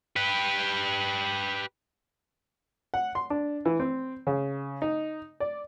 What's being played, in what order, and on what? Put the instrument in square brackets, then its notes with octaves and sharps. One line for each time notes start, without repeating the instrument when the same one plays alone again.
[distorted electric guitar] G4 B4
[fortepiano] F#5
C6
D4
E3
C4
C#3
D#4
D5